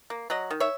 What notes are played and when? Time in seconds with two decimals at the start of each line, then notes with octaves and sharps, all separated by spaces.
0.10 A#3
0.30 F#3 D#5 F#5
0.51 D#3
0.60 C#5 E5